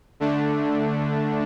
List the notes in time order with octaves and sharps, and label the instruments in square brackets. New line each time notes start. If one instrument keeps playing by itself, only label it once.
[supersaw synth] D3 A3 D4